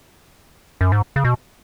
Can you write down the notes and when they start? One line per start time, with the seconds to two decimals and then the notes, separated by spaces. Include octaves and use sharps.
0.81 F#2
0.92 G#2
1.16 C#3
1.25 B2